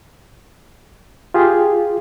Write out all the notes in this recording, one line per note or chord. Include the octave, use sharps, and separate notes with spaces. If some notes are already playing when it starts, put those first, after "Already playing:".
F4 G4 G#4